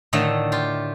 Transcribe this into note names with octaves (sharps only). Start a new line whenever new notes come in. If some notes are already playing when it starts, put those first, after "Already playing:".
A2 D3 D#3 A3 D#5
F4 G4